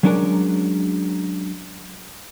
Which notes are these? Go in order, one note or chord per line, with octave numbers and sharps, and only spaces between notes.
F#3 G#3 C#4 D4 A#4